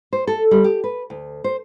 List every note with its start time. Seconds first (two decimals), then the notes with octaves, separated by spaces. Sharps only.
0.13 C5
0.27 A4
0.51 G3
0.64 G4
0.84 B4
1.10 D2
1.44 C5